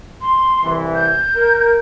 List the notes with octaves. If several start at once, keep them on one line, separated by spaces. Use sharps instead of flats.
C6
C2 E3
G6
A#4